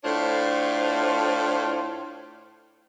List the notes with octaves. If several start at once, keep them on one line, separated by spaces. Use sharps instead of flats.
A2 A3 D4 F4 C5 C#5